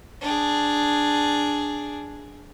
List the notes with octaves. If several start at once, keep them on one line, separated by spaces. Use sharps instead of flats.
D4 G#4